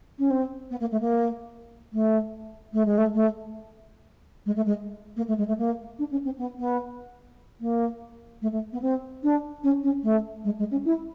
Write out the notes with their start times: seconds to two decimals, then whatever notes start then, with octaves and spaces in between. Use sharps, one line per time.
0.19 C#4
0.31 C4
0.71 B3
0.80 A#3
0.91 A3
1.00 A#3
1.93 A3
2.73 A3
2.85 G#3
2.98 A3
3.14 A3
4.46 G#3
4.56 A3
4.66 G#3
5.16 A#3
5.28 A3
5.38 G#3
5.48 A3
5.58 A#3
5.99 D4
6.11 C#4
6.25 C4
6.38 B3
6.59 B3
7.61 A#3
8.42 A3
8.52 A3
8.73 B3
8.82 C4
9.23 D4
9.64 C#4
9.83 C#4
10.03 A3
10.45 G#3
10.59 G#3
10.71 C#4
10.85 E4